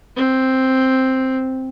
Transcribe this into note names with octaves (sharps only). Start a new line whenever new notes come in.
C4